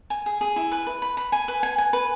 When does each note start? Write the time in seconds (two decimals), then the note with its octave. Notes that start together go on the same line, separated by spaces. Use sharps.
0.10 G#5
0.26 G#4
0.41 G#4
0.56 E4
0.72 B4
0.87 B4
1.02 B5
1.17 B5
1.32 G#5
1.48 B4
1.63 G#5
1.78 G#5
1.93 B4